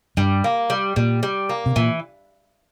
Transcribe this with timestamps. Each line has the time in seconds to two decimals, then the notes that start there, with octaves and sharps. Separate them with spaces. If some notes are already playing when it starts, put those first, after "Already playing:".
0.17 G2 G3
0.44 A#3
0.70 G3
0.96 A#2 G3
1.23 G3
1.49 A#3
1.66 C3
1.76 A#2 E3